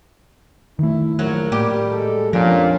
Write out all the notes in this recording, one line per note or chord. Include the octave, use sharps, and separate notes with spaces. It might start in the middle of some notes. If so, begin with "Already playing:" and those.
D#3 A3 E4
A#1 F#3 A#4
A2 G3 A3 A#3 G4
G#3 A4
F2 A#2 F3 C#4 D4 F5